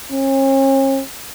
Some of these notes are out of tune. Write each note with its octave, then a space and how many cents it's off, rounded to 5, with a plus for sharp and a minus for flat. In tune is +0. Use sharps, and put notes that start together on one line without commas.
C#4 -40